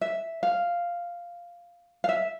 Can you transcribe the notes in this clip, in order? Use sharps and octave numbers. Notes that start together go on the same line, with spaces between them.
E5
F5
F5
E5